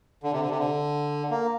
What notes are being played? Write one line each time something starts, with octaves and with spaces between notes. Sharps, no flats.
D3
C3
D3
C3
D3
A#3